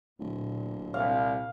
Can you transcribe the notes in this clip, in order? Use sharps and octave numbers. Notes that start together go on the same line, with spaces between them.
D1 A#2
C2 F5